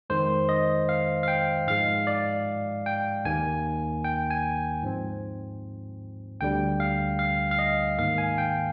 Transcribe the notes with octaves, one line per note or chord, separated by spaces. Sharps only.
F2 D#3 G#3 C5
D#5
F5
F5
G5
G#2 F3 G#3 F5
D5
G5
D#2 D#3 A#3 G#5
G5
G#5
G#2 F3 C4
D2 D3 G3 G5
F5
F5
F5
D#5
G#2 D#3 A#3 F5
G#5
G5